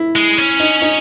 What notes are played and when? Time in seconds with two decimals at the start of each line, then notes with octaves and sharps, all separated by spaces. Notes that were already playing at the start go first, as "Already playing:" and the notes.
Already playing: E4
0.16 G#3
0.38 C#4
0.60 D#4
0.82 D#4